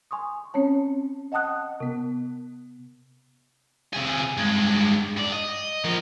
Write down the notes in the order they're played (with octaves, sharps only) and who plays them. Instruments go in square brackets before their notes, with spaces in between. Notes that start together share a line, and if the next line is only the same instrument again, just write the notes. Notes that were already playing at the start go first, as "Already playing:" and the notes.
[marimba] G#5 C6 C#6 D#6
C4 C#4 C#5 A5
D#5 F#5 G5 A5 D#6 F#6
C3 B3
[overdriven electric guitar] C3 G#4
G2 G#3
G2 D5
D#5
F3 A#4